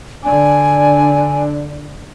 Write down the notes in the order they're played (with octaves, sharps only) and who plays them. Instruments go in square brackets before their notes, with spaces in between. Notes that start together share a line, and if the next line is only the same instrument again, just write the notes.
[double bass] D3 D4 [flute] G#5